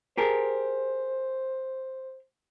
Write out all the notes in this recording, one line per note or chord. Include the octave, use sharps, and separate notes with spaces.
G4 G#4 A#4 C5